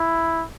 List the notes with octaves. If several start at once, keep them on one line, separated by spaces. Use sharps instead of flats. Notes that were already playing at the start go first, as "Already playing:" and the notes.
Already playing: E4